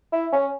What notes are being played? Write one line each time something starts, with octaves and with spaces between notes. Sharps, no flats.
E4
C#4